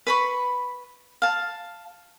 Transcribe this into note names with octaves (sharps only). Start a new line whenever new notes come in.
B4 B5 C#6
F5 A5